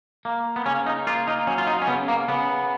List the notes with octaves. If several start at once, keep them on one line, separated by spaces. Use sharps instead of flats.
A#3
B3
C#3 C#4
D#4
A#3 F4
D#4
F#3 C#4
F4
D#4
C#4
C#3 B3
A#3
C#3 B3